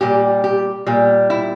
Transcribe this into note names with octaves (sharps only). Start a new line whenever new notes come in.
A#2 G3 G4
G4
A#2 G3
E4